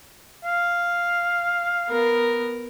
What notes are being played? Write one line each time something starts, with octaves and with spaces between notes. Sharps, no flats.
F5
B3 A#4